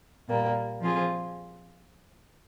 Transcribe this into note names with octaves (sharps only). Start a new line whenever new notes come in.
A#2 G3 A#3
F3 C4 F4 G#4